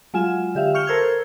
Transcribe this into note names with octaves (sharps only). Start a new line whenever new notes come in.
F#3 G#3 F4 G#5 E7
D3 G4 E5 F5
C#6 F6 G6 C#7 F7 G7
A4 A#4 C5 E6 G6 G#6